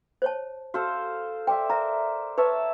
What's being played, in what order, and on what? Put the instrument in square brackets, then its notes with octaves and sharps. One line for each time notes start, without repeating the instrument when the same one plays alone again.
[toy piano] C5 C#5 A5
[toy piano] F#4 [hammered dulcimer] A4 C5 F5
[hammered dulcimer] C5 D5 E5 [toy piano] G5
[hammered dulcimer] A#4 [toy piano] E5 A#5
[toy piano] B4 [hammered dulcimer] C#5 E5 A5